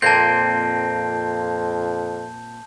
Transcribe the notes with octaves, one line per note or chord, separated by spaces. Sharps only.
F2 A#2 A#3 C4 A5 G6